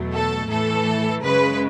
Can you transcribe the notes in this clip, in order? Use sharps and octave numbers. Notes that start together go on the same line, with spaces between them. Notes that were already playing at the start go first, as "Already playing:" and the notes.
Already playing: E2 B2 F#3 A3
A4
A2 E3 A3 A4
F#2 C#3 G#3 B4